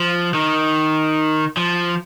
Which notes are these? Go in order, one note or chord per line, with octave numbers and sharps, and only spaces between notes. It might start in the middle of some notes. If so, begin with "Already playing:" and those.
Already playing: F3
D#3
F3